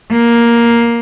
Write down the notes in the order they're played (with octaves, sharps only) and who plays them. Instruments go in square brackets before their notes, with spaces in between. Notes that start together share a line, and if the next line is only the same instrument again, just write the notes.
[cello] A#3